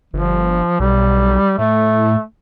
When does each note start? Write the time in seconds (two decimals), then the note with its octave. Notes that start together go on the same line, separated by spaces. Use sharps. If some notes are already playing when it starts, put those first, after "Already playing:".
0.14 G1 F3
0.80 B1 G3
1.58 A2 A3